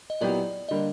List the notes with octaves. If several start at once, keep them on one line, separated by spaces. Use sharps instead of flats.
D#5
A#2 F#3 B3 E4 G4 D5
D3 G3 A#3 D#5